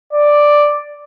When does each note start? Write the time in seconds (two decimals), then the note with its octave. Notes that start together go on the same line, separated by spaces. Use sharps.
0.13 D5